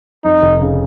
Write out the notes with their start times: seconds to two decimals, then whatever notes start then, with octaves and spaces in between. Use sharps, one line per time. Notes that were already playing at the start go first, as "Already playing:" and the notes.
0.24 F2 D#4
0.42 F1
0.61 C#3